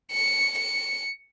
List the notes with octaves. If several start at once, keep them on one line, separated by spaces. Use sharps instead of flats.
C#7
C#7